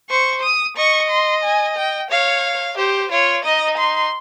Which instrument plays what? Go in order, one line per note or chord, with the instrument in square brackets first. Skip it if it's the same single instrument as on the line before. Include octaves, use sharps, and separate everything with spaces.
[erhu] C5 [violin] C#6
[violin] D#6
[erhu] D#5 [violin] C#6
[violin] C6
G#5
G5
[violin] C#5 [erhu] F5
[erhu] G4 [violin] C5
[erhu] F4 [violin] C#5
[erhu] D#4 [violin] D#5
[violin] C6